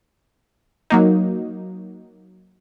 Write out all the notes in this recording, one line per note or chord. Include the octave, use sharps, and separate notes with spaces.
F#3 A#3 D#4